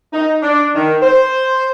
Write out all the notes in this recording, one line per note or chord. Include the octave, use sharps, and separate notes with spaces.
D#4
D4
D#3
C5